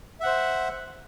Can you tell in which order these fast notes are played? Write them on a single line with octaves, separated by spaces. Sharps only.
E5 F#5 C5